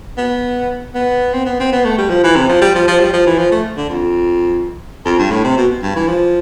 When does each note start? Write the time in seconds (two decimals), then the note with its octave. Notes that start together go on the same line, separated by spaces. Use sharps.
0.17 B3
0.95 B3
1.33 C4
1.46 B3
1.60 C4
1.72 B3
1.85 A3
1.98 G3
2.10 F3
2.24 E3
2.36 C3
2.49 F3
2.61 G3
2.75 F3
2.88 F3
3.00 G3
3.13 F3
3.26 E3
3.38 F3
3.51 A3
3.77 D3
3.89 F2
5.05 F2
5.18 G2
5.31 A2
5.44 C3
5.57 B2
5.83 G2
5.96 E3
6.08 F3